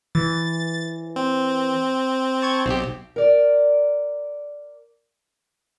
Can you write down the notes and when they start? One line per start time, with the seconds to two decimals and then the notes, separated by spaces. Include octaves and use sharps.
0.15 E3 A6
1.16 C4
2.42 A5 C#6 G#6
2.66 B1 C4 G4
3.16 A#4 D5